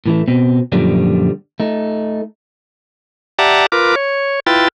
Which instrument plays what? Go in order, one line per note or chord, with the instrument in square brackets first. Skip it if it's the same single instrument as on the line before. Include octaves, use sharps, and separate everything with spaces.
[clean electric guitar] A2 E3 A3
B2 C4
F#2 A#2 D3 F3 G3
A3 D#4
[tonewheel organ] G4 D5 E5 F#5 A5 A#5
F4 A#4 B4 D6
C#5
E4 F4 B4 G5 A6